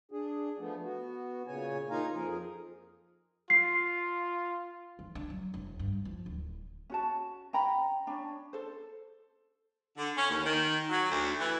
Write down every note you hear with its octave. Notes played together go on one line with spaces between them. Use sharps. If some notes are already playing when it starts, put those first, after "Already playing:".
D4 G#4
F3 A3 B3
B3 F#4
A#2 C#3 C#5 G#5
A#3 D#4 F4 F5 G#5 A#5
F2 F3 G#4 A#4
F4 C7
E3
D4
F#3
E1
G2
F3
D1
C#4 F#4 A5
C#4 G5 A#5 B5
C#4 D4
A4 C5
D3
C#4
D#2
D#3
F#3
D2
E3